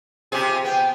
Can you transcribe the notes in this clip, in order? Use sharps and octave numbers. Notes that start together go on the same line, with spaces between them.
C3 F3 G4 G#4
B3 G5